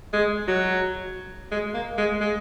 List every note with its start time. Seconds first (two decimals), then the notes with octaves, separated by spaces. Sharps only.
0.13 G#3
0.48 F#3
1.52 G#3
1.74 A#3
1.98 G#3
2.21 G#3